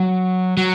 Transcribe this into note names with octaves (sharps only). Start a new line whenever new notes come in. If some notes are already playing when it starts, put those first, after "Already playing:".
Already playing: F#3
F#3